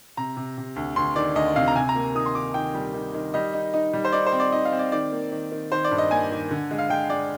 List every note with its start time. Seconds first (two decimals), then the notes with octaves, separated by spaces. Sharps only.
0.17 C3 A#5
0.37 C3
0.57 C3
0.76 D2
0.96 D2 C6
1.16 D#3 D5
1.35 D2 D#5
1.56 C3 F5
1.68 A#5
1.76 C3 G#5
1.89 A#5
1.95 A#3
2.15 D#3 D#6
2.26 C6
2.34 D#3 D6
2.54 D#3 G5
2.74 G3
2.94 D#3
3.14 D#3
3.34 G3 D#5
3.54 D#4
3.74 D#4
3.94 G3
4.05 C5
4.12 D#4 D5
4.26 C5
4.32 C4
4.40 D5
4.52 D#4 D#5
4.65 F5
4.72 C4
4.79 D5
4.92 D#3 D5
5.12 A#3
5.32 D#3
5.52 D#3
5.72 D#3 C5
5.84 D5
5.91 G2
5.98 D#5
6.11 A#3 G#5
6.31 D#3
6.51 D3
6.71 G#3
6.78 F5
6.90 G#3 G5
7.10 G#3 D5